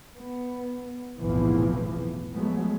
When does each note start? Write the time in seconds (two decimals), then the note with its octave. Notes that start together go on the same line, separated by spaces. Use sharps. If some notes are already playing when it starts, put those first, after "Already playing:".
0.16 B3
1.21 F1 B1 E2 A2 E3 F3
2.35 F3 F#3 G#3 A3 B3